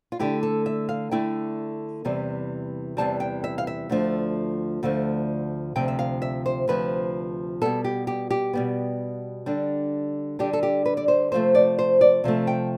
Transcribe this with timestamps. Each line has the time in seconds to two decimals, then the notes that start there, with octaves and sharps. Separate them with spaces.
0.12 F4
0.19 D3 A3 E4 G4
0.43 A4
0.66 E5
0.89 F5
1.11 D3 A3 E4 G5
2.05 E2 C3 E3 G3
2.97 E2 C3 E3 G3 A5
3.20 G5
3.44 E5
3.58 F5
3.67 E5
3.89 D2 D3 F3 A3
4.83 D2 D3 F3 A3
5.76 D2 C3 F3 G5
5.88 E5
5.99 F5
6.22 E5
6.46 C5
6.68 D2 C3 F3 B4
7.61 B2 G3 B3 A4
7.84 G4
8.07 G4
8.31 G4
8.53 B2 G3 B3
9.46 D3 G3 D4
10.39 D3 G3 D4 G4
10.53 A4
10.63 G4
10.86 B4
10.97 D5
11.08 C5
11.32 C3 F3 A3 C5
11.55 D5
11.79 C5
12.01 D5
12.24 C3 F3 A3
12.47 G5